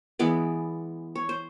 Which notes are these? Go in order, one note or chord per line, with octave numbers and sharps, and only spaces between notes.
E3 G#3 B3 D5
C#5
C5